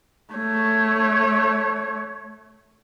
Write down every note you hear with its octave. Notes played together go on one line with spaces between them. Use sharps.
A3 C#5